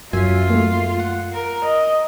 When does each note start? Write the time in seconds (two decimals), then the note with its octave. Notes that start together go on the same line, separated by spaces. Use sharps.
0.13 F#2 F4 E5 G#5
0.50 A3 A#3
0.99 F#5
1.33 A#4
1.64 D#5